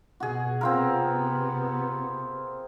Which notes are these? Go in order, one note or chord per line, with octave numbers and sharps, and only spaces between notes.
B2 F#4 G#4
C3 B3 C4 F4 A#4